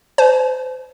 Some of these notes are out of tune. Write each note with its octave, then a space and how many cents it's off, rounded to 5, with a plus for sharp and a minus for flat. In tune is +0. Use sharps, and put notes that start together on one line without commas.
C5 -35 A5 -45